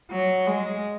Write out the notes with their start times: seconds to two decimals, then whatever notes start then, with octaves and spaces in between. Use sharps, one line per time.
0.11 F#3
0.47 G#3